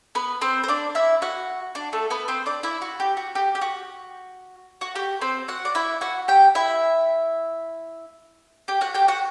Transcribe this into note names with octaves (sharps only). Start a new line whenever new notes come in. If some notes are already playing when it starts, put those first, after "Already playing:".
B3 B4
C4 C5
C5
D4 D5
E4 E5
F#4 F#5
D4 D5
A3 A4
B3 B4
C4 C5
D4 D5
E4 E5
F#4
G4
F#4
G4
G4
F#4
F#4
G4
C4 C5
F#4 F#5
D5
E4 E5
F#4 F#5
G4 G5
E4 E5
G4 G5
F#4 F#5
G4 G5
F#4 F#5